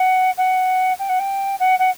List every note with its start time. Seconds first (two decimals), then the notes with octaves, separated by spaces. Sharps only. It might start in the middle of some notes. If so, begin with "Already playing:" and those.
Already playing: F#5
0.38 F#5
0.99 G5
1.09 F#5
1.19 G5
1.60 F#5
1.79 F#5